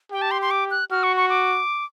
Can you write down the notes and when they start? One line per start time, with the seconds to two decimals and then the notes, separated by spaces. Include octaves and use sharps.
0.12 G4 G5
0.22 A5
0.31 C6
0.42 C6
0.51 D6
0.71 F#6
0.91 F#4 F6
1.03 C#6
1.17 C#6
1.29 D6